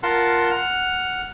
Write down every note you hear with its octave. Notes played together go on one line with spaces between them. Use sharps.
F4 A#4 F#5 A5 C6
F#5 F6